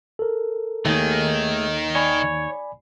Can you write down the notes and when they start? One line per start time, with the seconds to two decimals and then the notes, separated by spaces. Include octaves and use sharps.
0.19 A4 A#4
0.85 D#2 D#3 A3 G#4
1.95 C#5 D5 G#5 B5